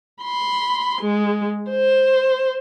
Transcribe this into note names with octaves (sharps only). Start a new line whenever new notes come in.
B5 C6
G#3
C5